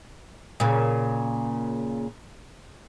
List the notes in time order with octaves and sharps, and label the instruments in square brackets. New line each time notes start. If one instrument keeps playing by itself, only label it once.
[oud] A#2 C#3